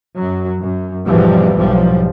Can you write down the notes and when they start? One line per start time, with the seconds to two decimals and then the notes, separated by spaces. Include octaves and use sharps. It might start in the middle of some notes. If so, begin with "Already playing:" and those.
0.16 F#2 F#3
0.61 F#2
1.06 G#1 E2 B2 E3 F3 G3
1.55 B1 G#2 F3 G3